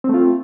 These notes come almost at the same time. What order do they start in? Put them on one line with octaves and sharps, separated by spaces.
C4 A3 F4